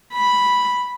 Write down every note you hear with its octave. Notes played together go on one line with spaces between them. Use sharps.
B5